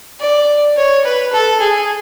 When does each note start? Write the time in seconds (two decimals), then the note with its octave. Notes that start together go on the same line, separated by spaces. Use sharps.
0.20 D5
0.77 C#5
1.05 B4
1.33 A4
1.60 G#4